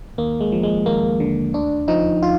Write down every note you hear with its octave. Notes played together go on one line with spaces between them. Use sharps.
D#2 A#3
G#3
F3
G#3
D#2 A#3
D3
D2 D4
F3 D#4
F4